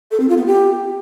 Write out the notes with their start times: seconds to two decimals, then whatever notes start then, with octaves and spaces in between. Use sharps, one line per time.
0.11 A4
0.20 C4
0.29 F4
0.38 B3
0.46 G4